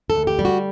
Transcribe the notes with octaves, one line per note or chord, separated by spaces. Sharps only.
A4
D2
G4
G3
F#4